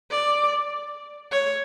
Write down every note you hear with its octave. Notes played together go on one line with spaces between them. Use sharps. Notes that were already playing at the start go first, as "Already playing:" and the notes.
D5
C#5